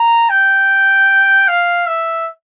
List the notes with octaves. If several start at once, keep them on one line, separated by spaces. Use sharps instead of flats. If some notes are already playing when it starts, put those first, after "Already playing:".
Already playing: A#5
G5
F5
E5